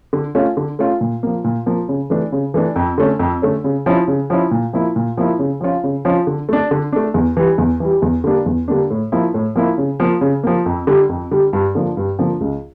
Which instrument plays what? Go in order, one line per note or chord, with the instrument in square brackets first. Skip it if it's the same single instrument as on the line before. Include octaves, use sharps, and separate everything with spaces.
[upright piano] D3
A3 C#4 F4
D3
A3 C#4 F4
A#2
F3 A#3
A#2
F3 A#3
C#3
E3 A3 D4
C#3
E3 A3 D4
F2
D3 A3 C#4
F2
D3 A3 C#4
C#3
F3 C#4 E4
C#3
F3 C#4 E4
A#2
F3 A#3 E4
A#2
F3 A#3 E4
C#3
F3 C#4 F4
C#3
F3 C#4 F4
D3
A3 D4
D3
A3 D4
E2
E3 G3
E2
E3 G3
E2
D3 G3 A#3 D4
E2
D3 G3 A#3 D4
A2
F3 A#3 E4
A2
F3 A#3 E4
C#3
F3 A#3
C#3
F3 A#3
F2
D3 G3
F2
D3 G3
G2
D3 F3 A#3 D4
G2
D3 F3 A#3 D4
C#2